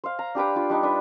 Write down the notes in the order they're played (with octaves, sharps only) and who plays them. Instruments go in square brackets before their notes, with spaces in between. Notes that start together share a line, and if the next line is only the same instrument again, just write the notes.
[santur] C5 F5
A#5
D4 G4 B4 G5
D4 F4
G3 D4 D#4 G4
D4 B4